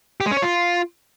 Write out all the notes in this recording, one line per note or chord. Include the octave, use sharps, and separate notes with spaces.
G4
G#3
C#4
C#5
F4